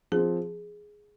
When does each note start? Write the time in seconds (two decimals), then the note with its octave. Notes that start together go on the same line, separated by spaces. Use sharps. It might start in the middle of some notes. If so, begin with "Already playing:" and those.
0.12 F3 C4 G#4